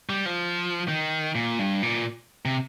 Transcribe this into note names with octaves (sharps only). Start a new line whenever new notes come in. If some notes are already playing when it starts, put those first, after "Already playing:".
G3
F3
D#3
A#2
G2
A#2
C3